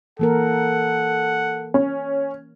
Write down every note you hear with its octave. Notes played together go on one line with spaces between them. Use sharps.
E3 A#3 A4 A#4 F#5
C#4